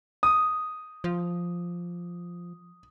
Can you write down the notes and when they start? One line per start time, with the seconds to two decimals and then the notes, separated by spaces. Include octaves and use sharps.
0.23 D#6
1.04 F3